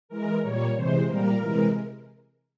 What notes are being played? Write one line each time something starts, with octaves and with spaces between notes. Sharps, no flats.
E3 G#3 A#4
A#2 G3 A#3 C#5
C3 E3 G#3 C5
A#2 G3 A#3 A#4
C3 E3 G#3